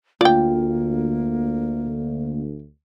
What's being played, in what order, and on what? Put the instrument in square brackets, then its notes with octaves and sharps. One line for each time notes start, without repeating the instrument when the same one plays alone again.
[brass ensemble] D2 [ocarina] A#3 [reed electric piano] F4 [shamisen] D5 G5